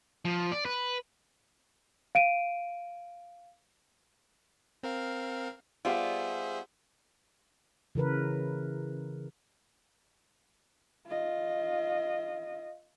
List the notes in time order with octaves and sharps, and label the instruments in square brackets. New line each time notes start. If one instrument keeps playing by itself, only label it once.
[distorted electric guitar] F3
D5
B4
[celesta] F5 D7 D#7
[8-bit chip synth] C4 A#4 F5
[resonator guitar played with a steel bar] G3 B3 F4 [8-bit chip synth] G#4 C5 E5
[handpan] C#3 E3 A#4 B4
[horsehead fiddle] F4 D#5